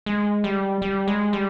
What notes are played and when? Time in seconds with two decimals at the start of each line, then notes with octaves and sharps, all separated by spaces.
0.06 G#3
0.44 G3
0.82 G3
1.08 G#3
1.33 G3